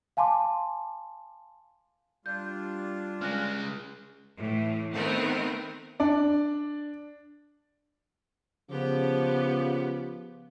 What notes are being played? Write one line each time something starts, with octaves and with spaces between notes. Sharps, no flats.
F5 G#5 A5 C6 D6
G3 D4 F4 G6
C#3 G#3 F6 F#6 A#6
A2 E3
D#3 A3 B3 C4 A#4
D4 D5
C#3 F3 B3 G4